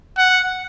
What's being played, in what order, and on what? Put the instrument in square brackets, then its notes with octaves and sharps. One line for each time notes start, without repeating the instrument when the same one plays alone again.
[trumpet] F#5